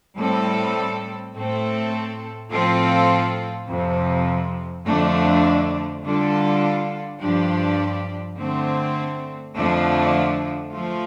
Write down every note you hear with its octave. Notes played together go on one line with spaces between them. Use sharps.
A2 G3 C4 A4
A2 A3 C4 A4
A2 F3 C4 F4 A4
F2 C3 F3
F2 D3 F3 A3 D4
D3 G3 D4 F4 A4
G2 F3 D4 G4
D3 A3 C4
F2 D3 F3 A3 D4
F3 A3 F4